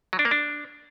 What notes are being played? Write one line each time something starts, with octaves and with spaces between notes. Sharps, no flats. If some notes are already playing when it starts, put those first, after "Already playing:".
F#3
D4
A#3
D4